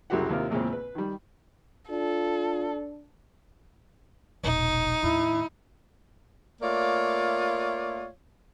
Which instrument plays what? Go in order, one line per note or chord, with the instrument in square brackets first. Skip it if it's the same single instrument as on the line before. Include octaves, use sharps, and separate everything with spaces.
[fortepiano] C2 F#2 C#3 F#4 G4 F#5
D#2 C3 F4 A#4
E2 A#2 C#3 G#3 C4
B4
D#3 G3
[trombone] D4 [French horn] F4 [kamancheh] A4
[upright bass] E1 A#1 [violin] D#4
[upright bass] D#2 A2 [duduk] E4
[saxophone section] A3 A#3 F4 C#5 D5